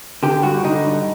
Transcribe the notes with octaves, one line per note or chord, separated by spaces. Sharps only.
D3 G4
G2 F#4
D3 D#4
G2